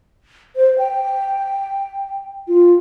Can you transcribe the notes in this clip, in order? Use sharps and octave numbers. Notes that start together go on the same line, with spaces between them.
C5
G5
F4